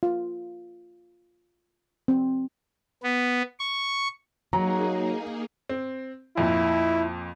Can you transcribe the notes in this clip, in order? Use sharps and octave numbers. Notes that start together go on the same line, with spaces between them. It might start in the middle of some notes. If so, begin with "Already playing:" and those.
F4
C4
B3
C#6
F#3 A#3 D#4 G#4 A#5
C4
F2 A#2 E4